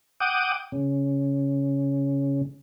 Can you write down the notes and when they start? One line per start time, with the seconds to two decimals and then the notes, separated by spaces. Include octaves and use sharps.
0.20 F#5 G5 D6 D#6
0.72 C#3